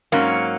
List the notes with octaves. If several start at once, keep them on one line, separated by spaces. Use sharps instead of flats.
G#2 F#3 A#3 C#4